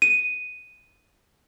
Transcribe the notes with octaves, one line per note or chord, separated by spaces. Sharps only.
D#7